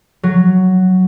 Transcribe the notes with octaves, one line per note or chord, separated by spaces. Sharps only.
F#3